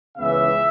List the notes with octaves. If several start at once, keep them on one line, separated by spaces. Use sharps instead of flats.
C#2 C#3 E3 B3 E5